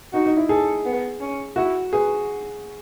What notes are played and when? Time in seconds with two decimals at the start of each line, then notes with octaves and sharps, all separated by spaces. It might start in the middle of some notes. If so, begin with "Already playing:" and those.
0.13 D#4 F#4
0.26 D#4
0.37 E4
0.49 G#4 A4
0.85 B3
1.20 C#4
1.56 E4 F#4
1.92 G#4 B4